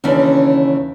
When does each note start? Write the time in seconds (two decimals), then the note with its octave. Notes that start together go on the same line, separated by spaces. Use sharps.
0.04 D#2 C#3 E3 C#4 D4